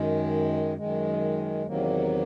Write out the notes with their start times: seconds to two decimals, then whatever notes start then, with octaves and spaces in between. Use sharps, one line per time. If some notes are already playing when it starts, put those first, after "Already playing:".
Already playing: F#2 D#3 G#3
0.77 F#2 D#3 G#3
1.66 E2 C3 D#3 F#3 A#3